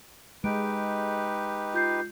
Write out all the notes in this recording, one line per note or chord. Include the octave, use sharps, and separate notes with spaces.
G#3 D#4 G4 B4 D7
F4 G6 C7